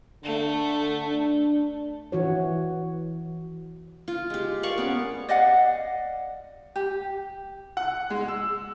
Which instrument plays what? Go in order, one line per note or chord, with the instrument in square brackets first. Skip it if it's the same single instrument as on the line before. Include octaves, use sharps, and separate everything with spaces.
[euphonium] D3 [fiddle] A3
[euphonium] D4
[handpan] E3 F#4 C#5
[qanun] F4
G#3 G4
A#4 D5 F5 C#6
B3 C#4
[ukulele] D5 D#5 F5 F#5
G4
[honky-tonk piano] F#5
G#3
E6